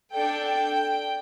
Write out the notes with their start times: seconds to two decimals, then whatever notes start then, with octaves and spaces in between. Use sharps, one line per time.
0.13 D4 A4 G5
0.46 G5